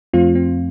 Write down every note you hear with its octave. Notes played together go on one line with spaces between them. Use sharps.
F2 F3 A3 C4 F4
C4